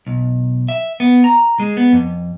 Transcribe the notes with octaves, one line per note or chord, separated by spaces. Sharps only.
B1
E5
B3
A#5
G#3
B3
F2